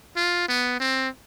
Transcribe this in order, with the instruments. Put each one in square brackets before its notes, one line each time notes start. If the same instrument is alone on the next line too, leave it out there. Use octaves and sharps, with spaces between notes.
[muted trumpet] F4
B3
C4